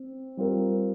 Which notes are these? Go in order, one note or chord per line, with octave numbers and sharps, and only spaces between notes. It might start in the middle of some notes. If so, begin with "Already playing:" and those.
Already playing: C4
G3 C4 F4 A#4